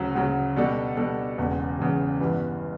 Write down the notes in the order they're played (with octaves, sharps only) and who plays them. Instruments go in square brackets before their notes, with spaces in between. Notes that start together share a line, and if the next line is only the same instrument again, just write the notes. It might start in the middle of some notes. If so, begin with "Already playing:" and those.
Already playing: [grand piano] D2 C#3 F#3
D2 C#3 F#3
B2 G3 D4 A4
B2 G3 D4 A4
E1 E2 C#3
E1 E2 C#3
G1 G2 E3 B3